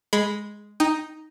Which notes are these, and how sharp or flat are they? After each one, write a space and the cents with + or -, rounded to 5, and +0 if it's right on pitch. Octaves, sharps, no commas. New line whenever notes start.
G#3 +0 B5 +0
D#4 +0 G5 +10